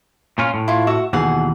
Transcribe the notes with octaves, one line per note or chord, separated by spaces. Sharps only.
A#2 C#4 F4
A2
E4 F4
F#4 E5 C#6
D#2 B2 E3 G#4 F#5